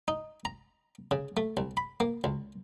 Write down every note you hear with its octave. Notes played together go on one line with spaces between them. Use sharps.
D#4
A#5
C#3
A3
C2
B5
A#3
C#2